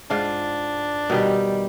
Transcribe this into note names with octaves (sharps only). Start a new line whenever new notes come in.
G#2 D4 F4
B2 D#3 G3 G4